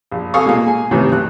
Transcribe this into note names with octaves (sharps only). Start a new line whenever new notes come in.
A#1
C3 A4 F5 G#5 C#6 D#6
A#2 G#3 A#3
G#4 G#5
A2 C3 D#3 E3
B1 F#6